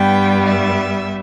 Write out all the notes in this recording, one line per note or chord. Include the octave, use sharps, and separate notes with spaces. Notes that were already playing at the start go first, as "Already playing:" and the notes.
Already playing: G2 G3 B3 G5
E5